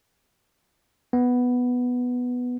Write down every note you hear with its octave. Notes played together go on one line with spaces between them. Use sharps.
B3